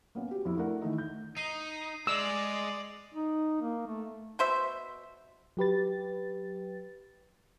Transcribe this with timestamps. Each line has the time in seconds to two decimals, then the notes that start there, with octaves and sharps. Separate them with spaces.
0.15 A#3 B3 C#4
0.31 F#4 G4
0.45 F2 E4
0.57 A3 D4 E4 A#4 F#5
0.82 D#3 E3 A3 D#4
0.98 G6
1.37 D#4 D#6 C7 D#7
2.07 G#3 D5 E6 F7 F#7
3.14 D#4
3.62 A#3
3.87 A3
4.39 B2 C5 E5
5.57 F#3 G4 B4 A6